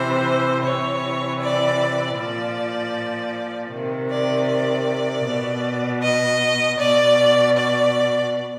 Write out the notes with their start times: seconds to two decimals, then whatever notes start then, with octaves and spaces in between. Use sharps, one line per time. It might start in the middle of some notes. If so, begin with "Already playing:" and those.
Already playing: C3 E3 C5
0.63 C3 E3 C#5
1.41 D5
2.18 A#2 F3 D5
3.72 C3 D#3
4.10 D5
4.49 D5
5.25 B2
6.02 D#5
6.79 B2 D5
7.57 D5